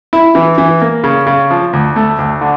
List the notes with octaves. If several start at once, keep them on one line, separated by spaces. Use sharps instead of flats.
E4
E3
E3
A#3
C#3
C#3
F3
D2
A3
D2
D3